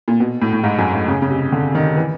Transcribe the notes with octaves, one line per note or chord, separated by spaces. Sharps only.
A#2
B2
A2
A2
G#2
F#2
G#2
C#3
C#3
C3
D3
D#3
E3